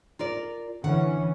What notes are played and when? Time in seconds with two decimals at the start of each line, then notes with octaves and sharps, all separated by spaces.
0.19 F4 A#4 D5
0.84 D3 E3 C#4 F#5